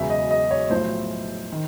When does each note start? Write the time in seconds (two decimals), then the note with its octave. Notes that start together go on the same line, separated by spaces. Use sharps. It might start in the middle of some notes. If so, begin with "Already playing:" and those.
Already playing: E1 E2 C#3 F#3 E5
0.10 D#5
0.31 D#5
0.51 C#5
0.70 B1 A2 F3 A3 C5
1.52 D#3